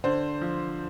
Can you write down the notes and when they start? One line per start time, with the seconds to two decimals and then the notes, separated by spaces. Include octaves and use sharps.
0.04 D3 C5
0.41 F3